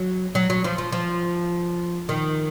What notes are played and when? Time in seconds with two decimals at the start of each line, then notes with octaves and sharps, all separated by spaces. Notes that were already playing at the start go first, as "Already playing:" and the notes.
Already playing: F#3
0.35 F#3
0.50 F#3
0.64 F3
0.78 F3
0.92 F3
2.09 D#3